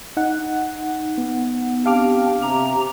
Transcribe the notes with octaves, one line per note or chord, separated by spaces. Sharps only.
D#4 F#5
B3
C4 D4 G4 F5 D6 F6
C3 G4 A#5